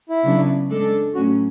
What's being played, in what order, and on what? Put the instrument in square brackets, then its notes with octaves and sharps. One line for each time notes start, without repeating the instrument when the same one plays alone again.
[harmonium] E4
[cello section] C#3 F#3 B3 D4
G#3 D4 A4
[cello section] A2 F#3 C#4 [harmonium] F#4